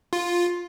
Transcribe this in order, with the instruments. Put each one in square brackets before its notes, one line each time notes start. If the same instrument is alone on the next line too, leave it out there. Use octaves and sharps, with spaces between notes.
[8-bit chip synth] F4